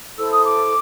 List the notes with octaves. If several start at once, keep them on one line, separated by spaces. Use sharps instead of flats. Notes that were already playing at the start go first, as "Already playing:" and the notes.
E4 A4 C5 E6
D#6
D6